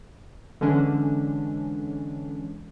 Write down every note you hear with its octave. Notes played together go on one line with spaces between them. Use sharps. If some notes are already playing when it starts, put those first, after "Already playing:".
D3 E3 G#3 C#4 D4